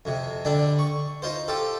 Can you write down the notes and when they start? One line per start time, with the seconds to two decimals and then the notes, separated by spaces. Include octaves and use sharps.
0.05 F2 C3
0.45 D3 G3 D4
0.79 C#6
1.22 D#4 F4 C5
1.48 F4 G4 A4